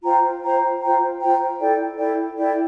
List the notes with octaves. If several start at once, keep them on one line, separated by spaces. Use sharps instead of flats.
F4 C5 G5 A#5
F4 C5 G5 A#5
F4 C5 G5 A#5
F4 C5 G5 A#5
E4 A4 D5 G5
E4 A4 D5 G5
E4 A4 D5 G5